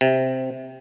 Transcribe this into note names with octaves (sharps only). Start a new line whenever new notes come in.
C3